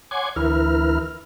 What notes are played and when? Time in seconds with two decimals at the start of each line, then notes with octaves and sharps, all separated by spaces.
0.11 C#5 F#5 G#5 C6 D6 G#6
0.36 D2 E3 E4 A#4 B4 F6